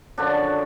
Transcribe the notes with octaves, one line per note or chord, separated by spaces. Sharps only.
F#2 D3 F3 D4